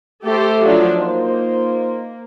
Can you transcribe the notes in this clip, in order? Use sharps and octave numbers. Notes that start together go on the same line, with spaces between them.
A3 G4 A4 C5
F3 F#3 D4
A#3 D#4 F4 C5